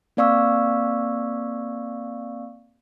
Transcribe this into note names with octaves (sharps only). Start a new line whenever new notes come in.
A#3 C4 D5 F5 C#6 E6